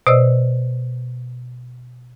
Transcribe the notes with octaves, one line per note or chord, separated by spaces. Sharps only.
B2 C5 D5 D#5 E6